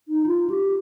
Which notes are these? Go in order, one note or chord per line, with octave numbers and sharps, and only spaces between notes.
D#4
F4
G4